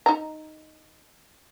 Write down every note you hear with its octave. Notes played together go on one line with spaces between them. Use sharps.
D#4 A#5